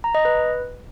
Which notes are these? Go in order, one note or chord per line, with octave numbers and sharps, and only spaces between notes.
A#5
D#5
B4